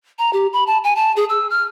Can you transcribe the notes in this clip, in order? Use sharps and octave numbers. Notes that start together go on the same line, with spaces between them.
A#5
G4
B5
A5
G#5
A5
G#4
E6
F6